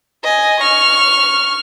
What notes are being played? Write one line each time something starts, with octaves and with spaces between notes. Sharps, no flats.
D#5 G#5
C#6 F6